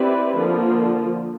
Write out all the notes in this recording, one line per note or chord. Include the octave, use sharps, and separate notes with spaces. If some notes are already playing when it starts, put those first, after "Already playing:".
Already playing: C4 E4 G4 B4 D5
D3 F3 A#3